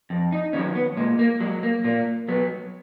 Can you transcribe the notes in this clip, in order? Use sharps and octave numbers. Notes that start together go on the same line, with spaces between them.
F2
D#4
D#3 F#3 C#4
B3
A#2 G#3
A#3
F#3 G#3
A#3
A#2 A#3
F#3 B3